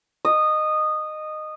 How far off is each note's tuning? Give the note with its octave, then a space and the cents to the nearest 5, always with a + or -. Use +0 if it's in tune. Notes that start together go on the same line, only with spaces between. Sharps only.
D#5 -15